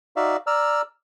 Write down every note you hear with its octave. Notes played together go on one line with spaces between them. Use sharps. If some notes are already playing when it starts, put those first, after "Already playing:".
D#4 F#4 D5 E5 F5
D5 A#5 E6 F6